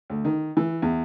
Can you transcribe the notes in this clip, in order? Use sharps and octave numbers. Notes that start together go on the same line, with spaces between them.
D2
D#3
E3
E2